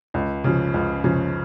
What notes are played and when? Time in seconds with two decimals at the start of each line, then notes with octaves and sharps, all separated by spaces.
0.14 C#2
0.44 C#3 F3
0.74 C#2
1.04 C#3 F3